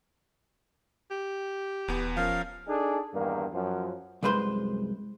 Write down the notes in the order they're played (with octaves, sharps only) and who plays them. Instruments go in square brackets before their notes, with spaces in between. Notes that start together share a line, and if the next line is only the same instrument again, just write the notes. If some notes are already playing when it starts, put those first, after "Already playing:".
[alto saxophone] G4
[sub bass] D#1 [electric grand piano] E2 B3
[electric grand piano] F3 C#4 A#4 [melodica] F5
[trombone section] D4 D#4 G#4 A4
E2 G2 D#3 A#3
F#2 F3
[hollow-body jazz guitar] C2 F#2 G#3 B4 C5 C6